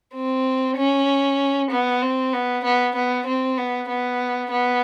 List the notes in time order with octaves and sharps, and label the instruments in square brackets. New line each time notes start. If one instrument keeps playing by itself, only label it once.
[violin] C4
C#4
B3
C4
B3
B3
B3
C4
B3
B3
B3